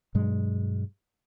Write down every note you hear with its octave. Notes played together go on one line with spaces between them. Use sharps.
G2 B2 F#3 G#3